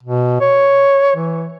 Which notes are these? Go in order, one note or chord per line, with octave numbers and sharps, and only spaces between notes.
B2
C#5
E3